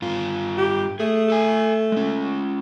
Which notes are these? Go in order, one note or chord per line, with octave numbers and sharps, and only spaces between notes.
G2 F4
G4
A3 G#4
A4 G#5
G#3 C#4